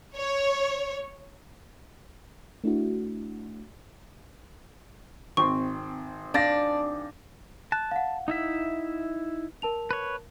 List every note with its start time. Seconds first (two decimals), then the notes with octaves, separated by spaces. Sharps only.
0.16 C#5
2.64 A3 D4 E4 F#4
5.37 G#1 C4 C6 C#6
6.34 D4 F5 A6 A#6
7.72 A5 F#6
7.91 F5 F#5
8.28 D#4 E4 E5
9.62 A#4 A5 F7
9.91 B4 C#5